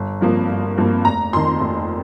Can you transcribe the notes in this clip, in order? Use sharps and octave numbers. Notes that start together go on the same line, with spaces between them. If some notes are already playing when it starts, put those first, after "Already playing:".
Already playing: G1
G2 F3 A#3
G1
G2 F3 A#3
F1 A#5
F2 D#3 C6
F1